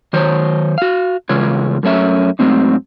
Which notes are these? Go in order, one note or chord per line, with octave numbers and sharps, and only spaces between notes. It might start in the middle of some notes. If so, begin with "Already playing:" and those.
D#3 F#3 C5 C#5
F#4 F5
E2 C#3 G#3 F4 C#5
F#2 A3 C#4 E5
G#2 F#3 A3 C4 D#4